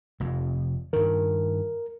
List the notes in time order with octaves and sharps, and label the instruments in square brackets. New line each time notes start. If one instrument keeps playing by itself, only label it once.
[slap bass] F1 F2
[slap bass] G2 D#3 [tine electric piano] A#4